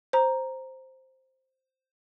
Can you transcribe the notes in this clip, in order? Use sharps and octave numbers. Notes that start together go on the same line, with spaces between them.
C5 A#5